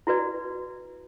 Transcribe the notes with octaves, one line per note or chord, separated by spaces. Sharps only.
E4 F#4 B4 D5